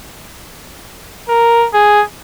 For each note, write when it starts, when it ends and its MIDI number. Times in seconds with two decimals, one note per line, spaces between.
1.29 1.67 70
1.74 2.03 68